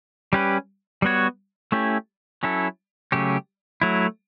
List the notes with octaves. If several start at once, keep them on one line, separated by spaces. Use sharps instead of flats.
G3 C#4 G4 B4
G3 B3 F#4 C#5
A3 C#4 E4 G4
F#3 C#4 E4 A4
C#3 F#3 A3 C#4 G4
F#3 A3 E4